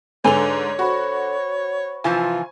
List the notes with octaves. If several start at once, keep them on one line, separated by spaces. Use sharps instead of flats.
G#2 D3 A4 B4 C#5 G#5 F7 G7
F#4 C5 B5 C#6
C3 E3 F3 F4 G#5